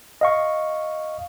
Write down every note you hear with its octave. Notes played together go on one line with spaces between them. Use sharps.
D#5 F5 C#6